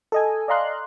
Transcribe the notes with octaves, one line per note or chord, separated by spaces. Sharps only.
A4 D#5 G#5
D5 D#5 F5 A#5 C6 F#6